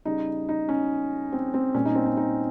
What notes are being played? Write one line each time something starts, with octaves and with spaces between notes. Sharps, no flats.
C#3 G3 D#4
D#4
C#4
C4
C4
A#2 G3 C#4
D#4
C4
C#4
D#4